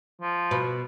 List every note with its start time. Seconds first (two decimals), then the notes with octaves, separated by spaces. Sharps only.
0.21 F3
0.51 B2